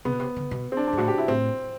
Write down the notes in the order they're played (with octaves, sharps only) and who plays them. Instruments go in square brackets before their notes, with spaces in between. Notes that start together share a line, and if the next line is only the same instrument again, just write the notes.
[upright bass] C3 [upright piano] B3
[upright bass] B2
C3
D3
B2
[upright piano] C4
D4
D4
[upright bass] G2
[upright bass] A2 [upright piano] F#4
[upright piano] G4
E4
[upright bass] A2 [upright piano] C4